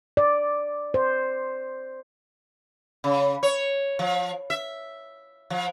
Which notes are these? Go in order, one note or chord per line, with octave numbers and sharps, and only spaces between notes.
D5
C5
C#3
C#5
F3
E5
F3